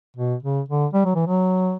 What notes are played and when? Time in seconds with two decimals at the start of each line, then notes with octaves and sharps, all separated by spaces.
0.17 B2
0.43 C#3
0.68 D3
0.93 G3
1.05 F#3
1.15 E3
1.27 F#3